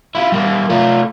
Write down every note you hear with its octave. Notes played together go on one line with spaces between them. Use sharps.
E4 F4
G3 A#3
A3 F4